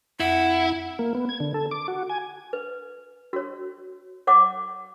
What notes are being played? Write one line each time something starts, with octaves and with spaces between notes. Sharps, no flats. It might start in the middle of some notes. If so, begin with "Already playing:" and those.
F2 E4 F#5
A#3
B3
G#6
D3
A4
D6
F#4
G#5
B4
F#4 C#5
C#5 F#5 D6